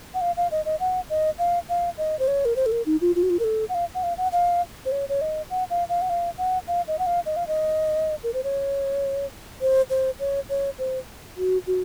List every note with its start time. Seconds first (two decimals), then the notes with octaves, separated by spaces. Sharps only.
0.14 F#5
0.21 F5
0.37 F5
0.51 D#5
0.65 D#5
0.80 F#5
1.10 D#5
1.39 F5
1.69 F5
1.98 D#5
2.19 C5
2.28 C#5
2.45 A#4
2.56 C5
2.66 A4
2.72 A#4
2.86 D#4
3.01 F4
3.16 F4
3.23 F#4
3.30 F4
3.39 A#4
3.44 A4
3.69 F#5
3.75 F5
3.95 F#5
4.03 F5
4.18 F#5
4.32 F5
4.86 C5
4.92 C#5
5.09 C#5
5.21 D#5
5.50 F#5
5.70 F5
5.89 F5
6.02 F#5
6.10 F5
6.38 F#5
6.68 F5
6.88 D#5
6.99 F#5
7.06 F5
7.26 D#5
7.36 F5
7.47 D#5
8.23 A#4
8.34 C5
8.44 C#5
9.61 C5
9.90 C5
10.20 C#5
10.49 C#5
10.79 C5
11.37 F#4
11.67 F#4